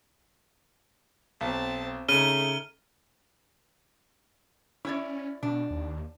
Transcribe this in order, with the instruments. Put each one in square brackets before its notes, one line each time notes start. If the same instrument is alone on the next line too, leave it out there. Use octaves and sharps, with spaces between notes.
[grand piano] B1 [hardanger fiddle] C4 A5
[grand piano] C#3 [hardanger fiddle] A3 D#4 [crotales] F6 D#7 G7
[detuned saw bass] C#4 [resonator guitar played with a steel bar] E4 C#5 D5
[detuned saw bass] B2 [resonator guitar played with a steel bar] D4
[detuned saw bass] D#2